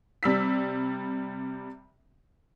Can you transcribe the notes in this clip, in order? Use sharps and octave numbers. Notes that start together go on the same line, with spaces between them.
C3 G3 E6 B6